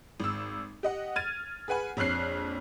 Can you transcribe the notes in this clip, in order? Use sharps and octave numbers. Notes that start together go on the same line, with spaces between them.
G#1 E6
G4 D#5 F#5
F6 G#6 A6 D#7
G#4 B4 F#5 G#5 B5
A#1 F2 C#5 F6 F#6 C7